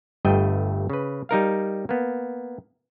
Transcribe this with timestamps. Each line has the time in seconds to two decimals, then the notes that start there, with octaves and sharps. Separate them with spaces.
0.25 G1 G2 A3 D#5 E5 G5
0.90 C#3 B4
1.29 G3 D#4 A#4 F5
1.89 A#3 B3